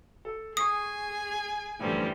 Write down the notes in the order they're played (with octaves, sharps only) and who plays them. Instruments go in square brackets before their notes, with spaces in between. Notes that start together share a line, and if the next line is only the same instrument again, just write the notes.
[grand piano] A4
[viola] G#4 G#5 [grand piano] C#6 C7 [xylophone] D#6
[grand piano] F#2 A2 D3 [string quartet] E3 F3 G3